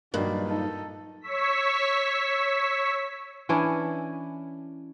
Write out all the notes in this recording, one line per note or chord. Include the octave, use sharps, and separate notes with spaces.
G2 A#2 D#3 F#3 A#3 D5
D#4 A4
C#5 C#6 E6 B6
E3 C#4 D4 E4